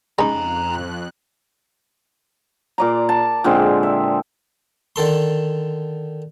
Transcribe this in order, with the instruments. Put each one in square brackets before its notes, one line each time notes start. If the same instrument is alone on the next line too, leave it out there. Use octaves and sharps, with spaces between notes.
[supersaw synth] F2 F#6 [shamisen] C#3 D#4 [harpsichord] G#3 [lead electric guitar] A#5 C6
[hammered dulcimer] A#2 D5 A#5
A5
A#2 D3 G#3 C4
E5
[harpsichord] D3 D#3 A4 C6